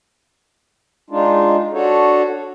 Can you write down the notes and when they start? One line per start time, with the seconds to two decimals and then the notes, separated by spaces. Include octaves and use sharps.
1.10 G#3 D4 D#4 F4
1.73 D4 F#4 A4 C#5